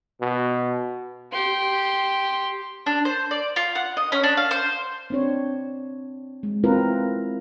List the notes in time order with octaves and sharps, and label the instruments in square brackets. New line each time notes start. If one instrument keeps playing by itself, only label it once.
[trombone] B2
[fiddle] G4 C6
[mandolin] D4
C5
D5
F4
F#5
D#5
C#4
D4
F5
C5
[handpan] C4 D4 C#5
G#3
C4 E4 F4 A#4 B4